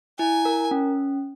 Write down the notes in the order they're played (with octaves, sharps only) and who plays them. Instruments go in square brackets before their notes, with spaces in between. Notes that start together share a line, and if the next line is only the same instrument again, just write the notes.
[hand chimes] E4 [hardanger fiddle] G#5
[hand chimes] A#4
C#4